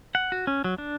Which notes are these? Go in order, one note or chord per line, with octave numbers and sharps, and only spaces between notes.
F#5
F#4
C#4
F#3
D4